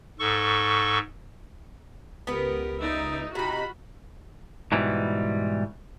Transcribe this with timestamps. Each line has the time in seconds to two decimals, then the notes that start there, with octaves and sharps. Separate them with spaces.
0.19 G#2 A4 C#6
2.27 C#2 B3 G4 A#4 B4
2.80 D#4 D5 E5
3.35 C3 D#4 F4 F#4 B5
4.72 G#2 B2 E3 G3